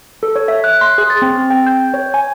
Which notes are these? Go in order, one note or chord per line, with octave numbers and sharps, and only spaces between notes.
A4
C#5
E5
F#6
C6
G#4
A6
C4
G5
G6
C#5
G#5